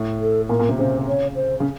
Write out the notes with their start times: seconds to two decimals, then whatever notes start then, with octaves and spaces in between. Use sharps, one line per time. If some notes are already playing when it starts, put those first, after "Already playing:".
Already playing: A2
0.22 A4
0.49 A#2 A#4
0.59 A#2
0.69 C3
0.78 C#3 C5
1.07 C#5
1.35 C5
1.60 C#3